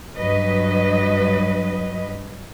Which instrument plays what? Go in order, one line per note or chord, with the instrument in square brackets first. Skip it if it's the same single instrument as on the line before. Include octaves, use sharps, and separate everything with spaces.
[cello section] G2 F#3 B4 D#5